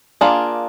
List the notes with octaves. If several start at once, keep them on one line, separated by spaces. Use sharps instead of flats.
A#3 D4 F4 G#4